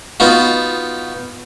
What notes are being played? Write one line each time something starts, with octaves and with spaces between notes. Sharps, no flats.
B3 D#4 F4 F#4